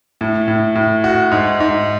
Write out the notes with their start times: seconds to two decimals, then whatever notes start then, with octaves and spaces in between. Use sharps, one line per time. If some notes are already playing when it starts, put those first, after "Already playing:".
0.21 A2
0.48 A2
0.75 A2
1.04 F#4
1.31 G#2
1.60 G#2